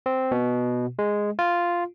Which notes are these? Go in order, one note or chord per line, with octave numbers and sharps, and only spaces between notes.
C4
B2
G#3
F4